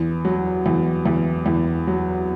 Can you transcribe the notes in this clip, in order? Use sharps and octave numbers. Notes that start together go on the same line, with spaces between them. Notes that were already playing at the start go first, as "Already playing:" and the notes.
Already playing: E2
F#3
E2
E2
E2
F#3